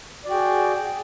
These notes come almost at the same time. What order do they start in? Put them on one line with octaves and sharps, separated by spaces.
D5 F#4 G5 G#4